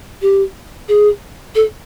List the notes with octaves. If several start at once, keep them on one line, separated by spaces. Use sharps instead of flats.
G4
G#4
A4